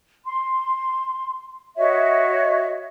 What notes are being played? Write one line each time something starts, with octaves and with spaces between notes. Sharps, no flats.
C6
F#4 C#5 D#5 E5